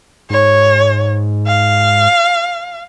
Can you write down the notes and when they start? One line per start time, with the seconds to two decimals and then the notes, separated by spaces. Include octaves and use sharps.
0.30 G#2 C#5
1.47 F5